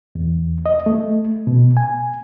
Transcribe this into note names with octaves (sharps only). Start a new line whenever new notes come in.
E2
D#5
A3
B2
G#5